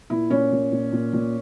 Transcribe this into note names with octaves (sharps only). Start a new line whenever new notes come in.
A#2 E4
A#2 C#4
A#2
A#2
A#2
A#2